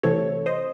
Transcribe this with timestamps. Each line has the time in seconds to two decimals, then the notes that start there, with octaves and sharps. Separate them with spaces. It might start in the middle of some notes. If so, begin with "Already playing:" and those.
0.03 C2 C3 E3 A3 C4 A4 C#5
0.46 C5 D#5